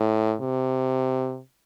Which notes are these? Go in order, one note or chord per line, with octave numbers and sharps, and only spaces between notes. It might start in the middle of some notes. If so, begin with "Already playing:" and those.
Already playing: A2
C3